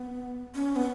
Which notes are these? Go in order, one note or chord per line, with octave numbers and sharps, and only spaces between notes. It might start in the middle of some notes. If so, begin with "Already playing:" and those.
Already playing: B3
C#4
B3